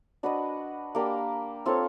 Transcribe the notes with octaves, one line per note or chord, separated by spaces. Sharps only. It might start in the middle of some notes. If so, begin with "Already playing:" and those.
D4 F#4 B4 D#5
A#3 D4 G4 A#4
C4 F4 A4 C#5